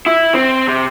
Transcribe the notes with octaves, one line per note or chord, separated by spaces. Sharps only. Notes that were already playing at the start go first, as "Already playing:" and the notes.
E4
C4
C3